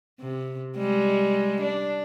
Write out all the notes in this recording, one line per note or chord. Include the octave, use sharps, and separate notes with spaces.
C3
G3 G#3
D4